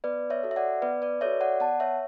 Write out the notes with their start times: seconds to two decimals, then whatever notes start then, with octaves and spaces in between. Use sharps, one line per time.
0.04 B3 B4 D5
0.30 C#5 E5
0.43 F#4 A4
0.51 E5
0.56 D5 F#5
0.82 B3 B4 D5
1.02 B4 D5
1.21 F#4 A4 C#5 E5
1.41 D5 F#5
1.60 B3 F#5 A5
1.80 C#5 E5